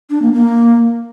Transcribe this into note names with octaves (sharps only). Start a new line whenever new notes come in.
D4
A#3
A#3